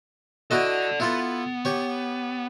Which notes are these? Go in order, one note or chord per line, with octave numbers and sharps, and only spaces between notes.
E4 F#4 A4 D5 D#5
B3 E4 F4 A4
G4 C#5